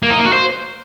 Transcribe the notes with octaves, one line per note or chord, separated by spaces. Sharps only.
A#3
D#4
A#3
F#4
C5